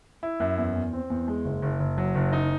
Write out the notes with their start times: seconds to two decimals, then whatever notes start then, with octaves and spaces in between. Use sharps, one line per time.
0.23 E4
0.40 F#2
0.58 E2
0.75 E2
0.93 C4
1.10 E2
1.28 G#3
1.44 F#1
1.62 F#1
1.79 F#1
1.98 F#3
2.15 F#1
2.33 D#4